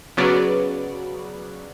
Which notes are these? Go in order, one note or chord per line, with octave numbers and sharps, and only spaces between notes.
C#3 F#3 B3 D5